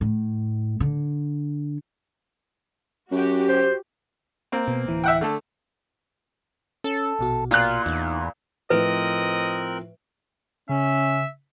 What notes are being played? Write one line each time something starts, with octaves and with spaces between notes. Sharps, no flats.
A2
D3
F#2 F#4 G4
C5
A#3 C4
B2
D1 E3
E5 F#5 G5
D3 A3 A4
C#4 A4
A#1 B2 F#4
A#2 F4 F#6
E2 D#4
A2 F3 C4 A#4 B4 D#5 F#6 D7
C#3 C#4 E5